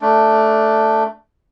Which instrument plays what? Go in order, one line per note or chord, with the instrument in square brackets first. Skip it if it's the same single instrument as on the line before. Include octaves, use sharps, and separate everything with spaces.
[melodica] A3 D4